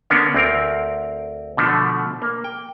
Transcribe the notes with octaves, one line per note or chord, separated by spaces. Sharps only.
D3 A#3 B3 C#4 D4
D2 C4 A#4
B2 D3 F3 A3
A#3
G5